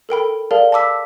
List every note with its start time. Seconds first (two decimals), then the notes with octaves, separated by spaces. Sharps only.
0.09 A4 A#4 G5 B5
0.51 G#4 A#4 D5 F5 A5
0.72 A5 B5 D6 E6 B6